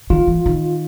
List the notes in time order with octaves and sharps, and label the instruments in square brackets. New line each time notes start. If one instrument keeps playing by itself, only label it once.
[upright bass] D#3 [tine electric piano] F4
[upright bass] E3
D#3